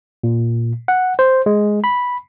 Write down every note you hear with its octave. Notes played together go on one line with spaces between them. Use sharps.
A#2
F#5
C5
G#3
B5